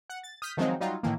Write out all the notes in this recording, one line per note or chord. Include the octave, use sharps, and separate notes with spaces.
F#5
A6
D#6 F6 G6 B6
D#3 F3 F#3 G#3 C4 D#4
F#3 G3 D#4 F4
A2 D#3 E3 A#3